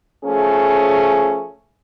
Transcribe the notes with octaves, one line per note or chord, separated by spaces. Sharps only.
F3 A3 C#4 G#4